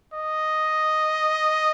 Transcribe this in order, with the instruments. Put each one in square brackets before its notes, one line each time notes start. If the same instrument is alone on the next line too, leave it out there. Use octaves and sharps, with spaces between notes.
[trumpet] D#5